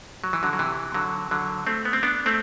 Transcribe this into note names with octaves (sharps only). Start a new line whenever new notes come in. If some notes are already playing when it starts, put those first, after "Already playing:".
F#3
E3
D3 F#3
F#3
C3 E3
D3 F#3
D3 F#3
A3 C4
B3
C4
B3 D4
A3 C4